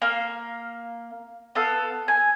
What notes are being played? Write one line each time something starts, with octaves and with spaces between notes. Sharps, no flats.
A#3 F5
B3 A4 F5
G#5